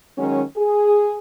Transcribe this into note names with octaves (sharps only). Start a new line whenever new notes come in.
D#3 F#3 G#3 C#4
G#4